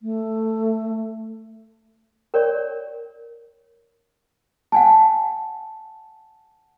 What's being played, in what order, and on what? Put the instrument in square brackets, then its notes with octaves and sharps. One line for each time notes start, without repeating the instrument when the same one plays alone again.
[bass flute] A3
[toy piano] A#4 C#5 D5
[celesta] F#5 G#5 A5